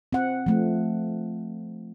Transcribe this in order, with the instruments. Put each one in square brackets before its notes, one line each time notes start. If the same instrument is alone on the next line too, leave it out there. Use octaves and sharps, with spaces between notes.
[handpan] C4 F#5
F3 A3